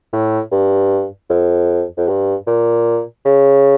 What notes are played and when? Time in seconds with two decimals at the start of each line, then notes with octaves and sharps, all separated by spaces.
0.13 A2
0.52 G2
1.30 F2
1.97 F2
2.08 G2
2.47 A#2
3.25 C#3